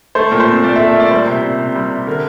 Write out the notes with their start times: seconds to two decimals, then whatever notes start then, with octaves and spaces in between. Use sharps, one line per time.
0.15 A3 C5
0.32 A#2
0.40 C5
0.48 C4
0.63 A#2 D5
0.76 E5
0.79 A3
0.88 E5
0.95 A#2 D5
1.11 G3 C5
1.27 C3
1.43 C4
1.59 C3
1.76 G3
1.91 C3
2.07 D3 A#4